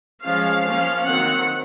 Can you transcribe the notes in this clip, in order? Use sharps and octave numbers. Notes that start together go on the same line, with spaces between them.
F3 G#3 C#4 F5
F3 A#3 C#4
D#3 F#3 C4 F#5